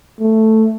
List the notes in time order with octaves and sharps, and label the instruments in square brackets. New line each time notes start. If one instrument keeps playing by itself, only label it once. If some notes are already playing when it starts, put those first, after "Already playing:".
[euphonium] A3